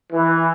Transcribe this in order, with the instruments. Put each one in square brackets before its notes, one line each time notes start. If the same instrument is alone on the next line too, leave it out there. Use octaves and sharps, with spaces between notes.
[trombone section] E3